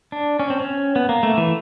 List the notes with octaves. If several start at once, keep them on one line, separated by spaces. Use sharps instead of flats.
D4
C#4
C4
C#4
B3
A#3
A3
E3